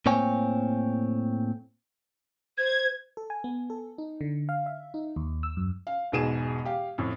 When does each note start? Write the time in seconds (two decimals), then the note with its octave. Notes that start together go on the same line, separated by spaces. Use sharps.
0.06 A2 A#3 C4 C#5 G5 G#5
2.58 C5 G#6
3.17 A4
3.30 G#5
3.44 B3
3.70 A4
3.98 D#4
4.21 D3
4.49 F5
4.66 E5
4.94 D#4
5.16 D#2
5.43 E6
5.57 F#2
5.87 F5
6.12 E1 G#2 B2 G#4 D#7 E7
6.65 G4 F5
6.98 F2 A2